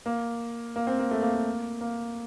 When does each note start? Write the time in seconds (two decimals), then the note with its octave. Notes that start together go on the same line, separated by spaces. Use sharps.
0.06 A#3
0.76 A#3
0.87 C4
0.99 A#3
1.11 A3
1.22 A#3
1.34 A#3
1.81 A#3